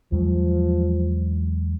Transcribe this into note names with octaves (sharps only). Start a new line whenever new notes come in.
E2 F3 F#3 G#3